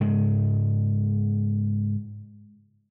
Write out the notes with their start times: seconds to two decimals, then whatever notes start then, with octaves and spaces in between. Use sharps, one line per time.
0.01 G#2 C#3 G#3